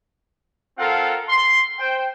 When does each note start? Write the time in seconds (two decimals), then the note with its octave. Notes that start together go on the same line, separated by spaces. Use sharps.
0.78 C4 F4 A4 A#4 F5 F#5
1.28 C6
1.80 C5 G5